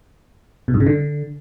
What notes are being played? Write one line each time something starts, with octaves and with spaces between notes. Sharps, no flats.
B2
G2
C#3
D3